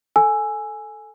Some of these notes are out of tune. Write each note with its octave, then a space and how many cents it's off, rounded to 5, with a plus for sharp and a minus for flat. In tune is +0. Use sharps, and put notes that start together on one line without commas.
A4 +0 G#5 +5 E6 +10